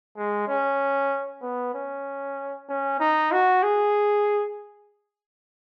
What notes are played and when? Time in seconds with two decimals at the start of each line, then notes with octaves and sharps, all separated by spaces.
0.17 G#3
0.48 C#4
1.42 B3
1.75 C#4
2.69 C#4
3.00 D#4
3.32 F#4
3.63 G#4